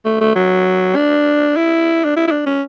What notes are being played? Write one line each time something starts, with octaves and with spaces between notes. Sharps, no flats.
A3
A3
F#3
D4
E4
D4
E4
E4
D4
C#4